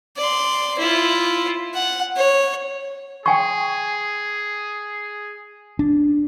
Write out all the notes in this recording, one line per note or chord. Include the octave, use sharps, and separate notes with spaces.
D5 C6
E4 F4
F#5
C#5
G#4 G5 G#5 C#6
D4